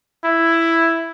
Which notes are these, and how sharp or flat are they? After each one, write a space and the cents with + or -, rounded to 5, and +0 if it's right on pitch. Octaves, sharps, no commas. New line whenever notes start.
E4 +5